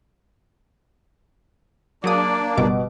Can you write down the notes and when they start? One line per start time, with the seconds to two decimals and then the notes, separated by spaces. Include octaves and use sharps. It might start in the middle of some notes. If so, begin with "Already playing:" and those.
2.04 F#3 A#3 D4 G#4 D5 D#6
2.57 G1 B2 G3 D6